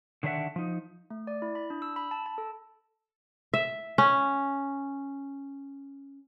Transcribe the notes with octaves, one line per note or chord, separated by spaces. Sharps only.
D3 D#3 D4 C5 E5 F#5
F3 D#4
A3
D5
E4
B5
D4
E6
B5
A5
A5
A4
E5
C#4